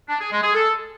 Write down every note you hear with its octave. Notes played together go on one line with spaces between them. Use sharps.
D4
G#4
G#3
G#4
A4